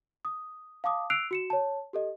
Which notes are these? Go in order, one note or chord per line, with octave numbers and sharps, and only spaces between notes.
D#6
F5 A5 D6 D#6
E6 F#6 C7 D7 F7
F#4 C#7 E7
C#5 A5
G4 A4 D#5